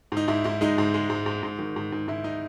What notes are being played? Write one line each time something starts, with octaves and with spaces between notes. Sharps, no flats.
G#2 D#4
G#2 E4
G#2 E4
G#3 D#4
G#2
G#3
G#2
G#2
G#2
D#3
G#2
G#2
G#2 E4
D#4